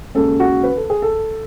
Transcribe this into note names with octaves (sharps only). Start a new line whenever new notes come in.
D#2 C#3 G#3 C#4 A4
F#4
B4
A4
G#4
A4